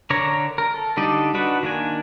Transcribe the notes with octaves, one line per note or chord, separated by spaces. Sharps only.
D3 D4 A#4 C#5 A#5
A#4
A4
D3 G3 D#4 A4 D5
D4 D#4 F#4 B4 F#5
D#3 A#3 D4 G#5